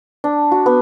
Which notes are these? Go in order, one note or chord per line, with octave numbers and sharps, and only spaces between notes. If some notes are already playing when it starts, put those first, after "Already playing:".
D4
F#4
B3